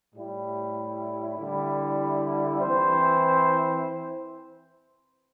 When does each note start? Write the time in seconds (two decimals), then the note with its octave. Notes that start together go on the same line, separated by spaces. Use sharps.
0.14 A2 G3 E4
1.38 D3 G3 E4
2.61 E3 C4 E4 C5